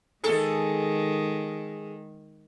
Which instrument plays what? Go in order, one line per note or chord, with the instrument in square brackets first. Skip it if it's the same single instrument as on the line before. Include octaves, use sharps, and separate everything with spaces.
[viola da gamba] D#3 G#3 [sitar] G#4 A4